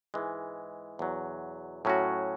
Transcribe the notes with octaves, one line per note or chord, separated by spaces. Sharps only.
G#2 E3 G#3
E2 B2 F#3
A2 F#3 C#4 F#4